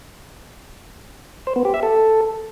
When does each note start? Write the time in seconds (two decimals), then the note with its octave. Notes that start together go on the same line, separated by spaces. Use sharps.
1.47 C5
1.56 B3
1.65 G4
1.74 E5
1.83 A4